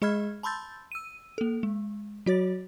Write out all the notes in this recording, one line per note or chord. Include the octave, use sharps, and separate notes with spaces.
G#3 G#4 D#5 B5 F6 G#6
A5 B5 C6 E6 G6 A6
E6 D#7
A#3 A4
G#3
F#3 F#4 C#5 A6